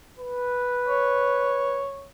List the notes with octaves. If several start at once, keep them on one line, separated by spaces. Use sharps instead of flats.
B4
C#5